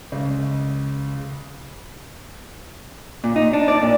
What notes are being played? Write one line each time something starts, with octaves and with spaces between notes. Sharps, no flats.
C#2
A#2
D#4
D4
D5
A#2